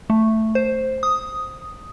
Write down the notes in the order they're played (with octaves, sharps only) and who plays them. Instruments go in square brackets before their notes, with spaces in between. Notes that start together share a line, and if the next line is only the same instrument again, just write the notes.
[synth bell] A3
C5
D#6